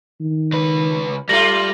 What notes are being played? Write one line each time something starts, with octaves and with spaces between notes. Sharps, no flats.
D#3
C#2 B4
G3 A3 F4 A#6 F#7